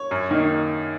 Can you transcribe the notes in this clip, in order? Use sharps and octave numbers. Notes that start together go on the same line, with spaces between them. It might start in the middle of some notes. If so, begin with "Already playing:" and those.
Already playing: C#5
F#2
D#3 A#3 D#4